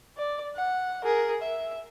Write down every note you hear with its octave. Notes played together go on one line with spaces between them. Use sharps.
D5
F#5
G#4 A#4
E5